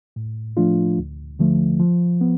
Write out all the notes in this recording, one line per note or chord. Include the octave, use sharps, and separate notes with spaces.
A2
F3 A3 D4 F4
D2
D3 F3 A3
F3
B3